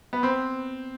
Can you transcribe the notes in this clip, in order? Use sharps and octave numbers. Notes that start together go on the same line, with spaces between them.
B3
C4